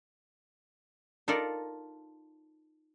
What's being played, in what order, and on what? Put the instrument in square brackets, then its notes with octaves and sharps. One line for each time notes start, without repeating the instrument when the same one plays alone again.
[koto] D#4 F4 A4 A#4 D5